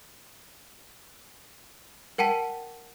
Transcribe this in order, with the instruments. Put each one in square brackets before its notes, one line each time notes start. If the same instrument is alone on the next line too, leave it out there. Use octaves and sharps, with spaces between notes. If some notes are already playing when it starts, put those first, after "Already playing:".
[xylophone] A#4 F#5 G5 A5 B6